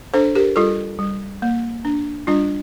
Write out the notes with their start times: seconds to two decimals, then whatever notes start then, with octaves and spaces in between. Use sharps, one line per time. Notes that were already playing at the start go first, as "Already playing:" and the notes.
0.14 D4 A4 C5
0.35 G4 A#4
0.56 G3 F4 A4
0.99 G3
1.42 A#3
1.85 D4
2.27 G3 D4 F4